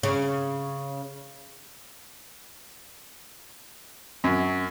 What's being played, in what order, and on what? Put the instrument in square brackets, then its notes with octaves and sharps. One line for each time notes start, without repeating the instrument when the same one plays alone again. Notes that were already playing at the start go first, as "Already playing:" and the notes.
[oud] C#3
[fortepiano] F#2